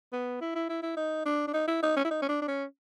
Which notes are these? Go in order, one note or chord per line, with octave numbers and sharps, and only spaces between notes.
B3
E4
E4
E4
E4
D#4
D4
D4
D#4
E4
D#4
C#4
E4
D#4
C#4
D4
D4
C#4